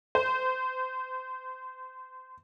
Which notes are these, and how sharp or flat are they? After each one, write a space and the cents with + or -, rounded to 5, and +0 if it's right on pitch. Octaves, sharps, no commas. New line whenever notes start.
C5 -30